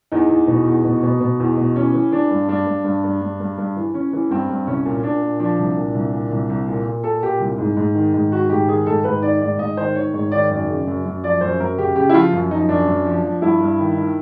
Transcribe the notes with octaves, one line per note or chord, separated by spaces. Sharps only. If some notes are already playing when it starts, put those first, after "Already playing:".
E2 D#4
E2
B2
E2
B2
B2
B2
E2
B2
E3 C#4
E3
E3 D4
G2
G2 D4
G2
G2
G2
G2
G2
G2
E3
E3 C#4
E3
G2 C4
G2
C2 C#4
A#2
A#2 D4
A#2
F3 D4
C2
A#2
C2
A#2
C2
C2
A#2
A#2
A#2 A4
A#2 G4
C2
G#2
G#2
D#3
G#2
D#3 F#4
G#2 G4
D#3 G#4
G#2 A4
G#2 B4
D#3 D5
G#2 D5
G#2 D#5
D#3 C5
D#3 C#5
G#2 C#5
D#3 D5
F#2 D5
C#3
F#2
F#2
F3 D5
F#2 C5
F#2 A#4
C#3 G4
C#3 G4
E4
F3 F4
F#2
F3 D#4
F#2 D4
F#2
F3
F3
G2 E4
G2
D#3
D#3